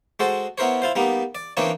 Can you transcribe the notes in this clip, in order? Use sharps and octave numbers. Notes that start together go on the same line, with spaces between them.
G#3 F#4 A4 C5
B3 E4 A#4 C5 C#5
E4 F4 C5
G3 A#3 B3 D#4
D5
E3 A#3 C4 D4 D#4 C#5